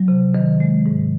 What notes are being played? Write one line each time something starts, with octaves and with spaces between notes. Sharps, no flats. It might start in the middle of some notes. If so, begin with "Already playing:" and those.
Already playing: F#3
C3
D#3
G#3
G#2